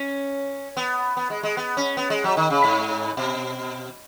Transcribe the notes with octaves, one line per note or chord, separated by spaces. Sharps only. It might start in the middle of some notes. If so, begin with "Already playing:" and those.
Already playing: C#4
B3
B3
G#3
G#3
B3
C#4
B3
G#3
F#3
D#3
C#3
G#2
B2